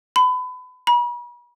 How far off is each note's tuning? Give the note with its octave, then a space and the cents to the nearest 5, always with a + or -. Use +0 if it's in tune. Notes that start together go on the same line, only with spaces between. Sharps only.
B5 +30
B5 -40